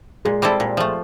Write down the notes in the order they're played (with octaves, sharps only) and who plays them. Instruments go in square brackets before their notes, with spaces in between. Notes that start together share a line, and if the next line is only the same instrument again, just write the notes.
[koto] A#2 [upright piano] G#3
[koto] G3 C4 E4 A4
A#2
F3 A3